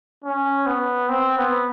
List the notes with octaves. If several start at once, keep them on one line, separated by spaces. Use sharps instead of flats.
C#4
B3
C4
B3